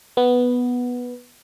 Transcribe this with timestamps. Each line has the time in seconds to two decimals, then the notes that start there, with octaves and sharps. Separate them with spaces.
0.17 B3